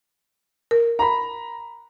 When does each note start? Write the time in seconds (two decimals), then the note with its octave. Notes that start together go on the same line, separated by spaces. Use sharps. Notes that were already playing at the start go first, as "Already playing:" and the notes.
0.71 A#4
0.99 A#5 B5